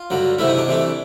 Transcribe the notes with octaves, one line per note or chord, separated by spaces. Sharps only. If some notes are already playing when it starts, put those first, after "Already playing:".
Already playing: F4
G2 D3 F#3
C3 E3 A3 E4
D#4
D4
C3 E3 A3